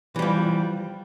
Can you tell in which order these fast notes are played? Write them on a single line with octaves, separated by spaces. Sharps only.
E3 G3 F3